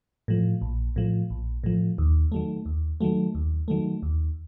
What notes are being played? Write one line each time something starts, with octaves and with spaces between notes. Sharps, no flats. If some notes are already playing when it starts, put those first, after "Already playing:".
A2 F3
A#1
A2 F3
A#1
A2 F3
D#2
D#3 F#3 A3
D#2
D#3 F#3 A3
D#2
D#3 F#3 A3
D#2